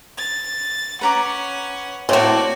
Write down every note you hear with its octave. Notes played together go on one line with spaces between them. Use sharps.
A6
C#4 B4 F#5 A#5 D6
A2 A#3 C4 F#4 C5 D5 F#5